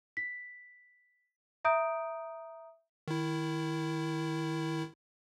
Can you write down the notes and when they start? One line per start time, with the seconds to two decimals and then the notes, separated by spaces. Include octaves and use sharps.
0.17 B6
1.65 E5 A#5 D#6 G6 D7
3.08 D#3 E4